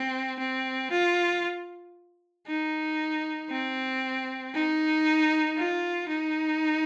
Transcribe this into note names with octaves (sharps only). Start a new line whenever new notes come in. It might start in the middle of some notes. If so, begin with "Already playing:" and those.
Already playing: C4
C4
F4
D#4
C4
D#4
F4
D#4